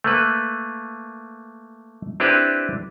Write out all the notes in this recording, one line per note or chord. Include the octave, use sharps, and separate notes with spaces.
A3 A#3 B4
C4 D4 E4 G4 B4